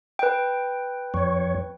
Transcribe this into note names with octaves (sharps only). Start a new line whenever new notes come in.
B4 G5
F2 C#5